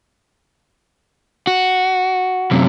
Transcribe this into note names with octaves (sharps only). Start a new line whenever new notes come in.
F#4
F#2 C3